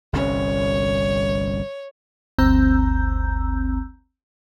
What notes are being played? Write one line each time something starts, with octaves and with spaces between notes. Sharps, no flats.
G1 C2 C#4 C#5
G1 D2 C4 A#5 E6 G6